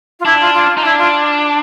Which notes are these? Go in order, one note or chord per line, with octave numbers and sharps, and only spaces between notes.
F4
D4 E4
F4
F4
D#4
D4 E4
F4